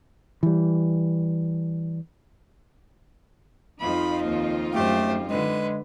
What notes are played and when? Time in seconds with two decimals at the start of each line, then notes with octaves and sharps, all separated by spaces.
0.43 E3 G3
3.80 F2 D#4 F4 B5
4.22 D#2
4.71 F#2 A3 G4 C5
5.28 D3 G#3 B4